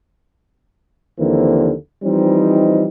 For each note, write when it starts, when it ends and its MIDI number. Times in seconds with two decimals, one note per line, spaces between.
1.19 1.72 39
1.19 1.72 50
1.19 1.72 52
1.19 1.72 53
1.19 1.72 58
1.19 1.72 60
2.03 2.87 52
2.03 2.87 53
2.03 2.87 55
2.03 2.87 60
2.03 2.87 63